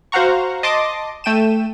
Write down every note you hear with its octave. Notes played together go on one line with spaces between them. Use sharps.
F#4 C5 F5 F#5 A#5 C#6
D#5 A5 C6 D6 D#6
A3 G5 D#7 E7